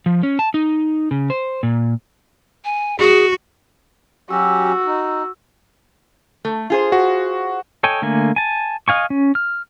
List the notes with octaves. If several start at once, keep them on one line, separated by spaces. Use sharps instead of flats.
F3
C#4
A5
D#4
C#3
C5
A#2
G#5
F#4 G#4
F#3 C#4 F#4 G4 E6
D#4
A3
F4 G#4 C5
F#4
A4 C#5 D#5 G5 G#5
D3 A3 A#3 G#5
G#5 A5
D#5 F5 G#5 C#6
C#4
F6